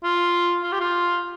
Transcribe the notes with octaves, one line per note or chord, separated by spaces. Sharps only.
F4
F4
G4
F4